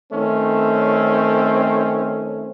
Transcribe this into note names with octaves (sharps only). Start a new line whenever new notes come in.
D#3 A3 C4 C#4